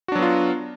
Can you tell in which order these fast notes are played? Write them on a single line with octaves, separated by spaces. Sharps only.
F#4 D4 F#3 B3 F4